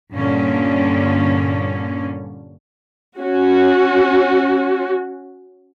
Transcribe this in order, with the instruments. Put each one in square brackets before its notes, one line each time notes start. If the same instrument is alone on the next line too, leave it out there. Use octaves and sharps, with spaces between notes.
[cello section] G2 A#2 D3 C#4
[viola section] C#4 F#4